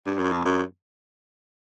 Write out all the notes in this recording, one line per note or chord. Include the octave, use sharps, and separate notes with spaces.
G2
F#2
F2
F#2